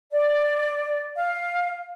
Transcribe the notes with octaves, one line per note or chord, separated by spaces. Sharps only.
D5
F5